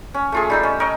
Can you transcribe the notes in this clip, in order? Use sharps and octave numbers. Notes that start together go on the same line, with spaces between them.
C#4
A3 F4 G#4
G3 D#4 E6
C#4
A#4 C#5 D#5